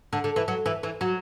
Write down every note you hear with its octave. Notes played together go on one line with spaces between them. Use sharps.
D3
D3
E3
F#3
E3
E3
F#3